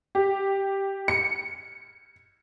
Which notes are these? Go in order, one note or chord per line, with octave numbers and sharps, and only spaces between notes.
G4
C#7